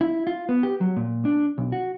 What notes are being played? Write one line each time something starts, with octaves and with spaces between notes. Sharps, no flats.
E4
F4
B3
G4
F#3
A#2
D4
B1
F#4